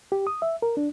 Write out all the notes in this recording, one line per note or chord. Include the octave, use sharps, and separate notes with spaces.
G4
D#6
E5
A#4
D4